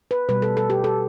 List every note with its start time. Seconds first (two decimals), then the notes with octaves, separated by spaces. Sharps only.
0.11 B4
0.29 B2 G3 B4
0.42 A4
0.57 A4
0.70 G4
0.84 A4